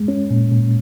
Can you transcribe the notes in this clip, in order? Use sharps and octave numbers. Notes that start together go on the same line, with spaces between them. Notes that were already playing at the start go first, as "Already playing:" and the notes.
Already playing: G#3
C#4
A#2
A#2